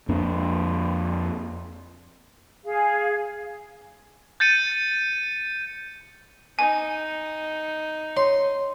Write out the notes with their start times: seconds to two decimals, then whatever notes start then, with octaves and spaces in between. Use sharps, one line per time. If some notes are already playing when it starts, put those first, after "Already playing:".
0.09 F2 A#3 D4
2.64 G#4 F5
4.40 G6 A6 C#7 D#7
6.59 D#4 G#5
8.17 C#5 C6